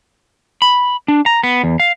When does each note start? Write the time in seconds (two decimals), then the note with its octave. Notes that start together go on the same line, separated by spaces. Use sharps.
0.62 B5
1.08 D4
1.26 A#5
1.44 B3
1.64 E2
1.80 F5